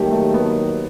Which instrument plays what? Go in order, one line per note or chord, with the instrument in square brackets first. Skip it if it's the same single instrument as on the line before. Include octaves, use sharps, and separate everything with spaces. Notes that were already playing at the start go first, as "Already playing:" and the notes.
Already playing: [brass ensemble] D#2 D#3 F#3 [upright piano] G3 A3 G4
[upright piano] A3
B3